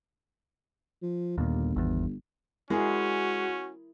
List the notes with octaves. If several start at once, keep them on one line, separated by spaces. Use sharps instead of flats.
F3
G1 D#2 A#2
G#1 E2
G#3 C#4 E4 F#4 G#4 A#4